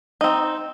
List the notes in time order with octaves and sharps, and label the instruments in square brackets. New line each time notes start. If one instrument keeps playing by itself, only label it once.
[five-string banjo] C4 D#4